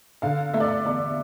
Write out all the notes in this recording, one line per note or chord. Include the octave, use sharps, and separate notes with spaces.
D3 F5
A3 E5
D5
E5
E2 D5